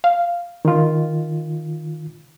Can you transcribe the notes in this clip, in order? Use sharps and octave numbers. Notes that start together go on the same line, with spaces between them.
F5
D#3 F4